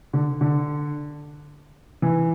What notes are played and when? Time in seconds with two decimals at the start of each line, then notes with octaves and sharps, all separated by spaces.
0.13 D3
0.41 D3
2.02 E3